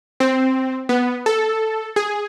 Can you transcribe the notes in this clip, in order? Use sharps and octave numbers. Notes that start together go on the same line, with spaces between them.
C4
B3
A4
G#4